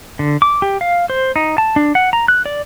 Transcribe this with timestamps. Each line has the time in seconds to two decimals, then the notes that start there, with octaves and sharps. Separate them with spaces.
0.19 D3
0.42 D6
0.62 G4
0.81 F5
1.10 C5
1.36 D#4
1.58 A5
1.76 D4
1.95 F#5
2.13 A#5
2.28 F#6
2.46 D5